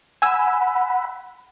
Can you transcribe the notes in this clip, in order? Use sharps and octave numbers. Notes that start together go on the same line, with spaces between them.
F#5 G#5 B5 E6